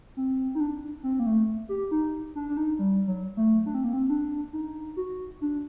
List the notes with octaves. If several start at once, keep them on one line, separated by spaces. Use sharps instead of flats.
C4
D#4
D4
C4
A#3
A3
G4
D#4
D4
D4
D#4
G3
F#3
A3
D4
C4
A#3
C4
D4
D#4
F#4
D4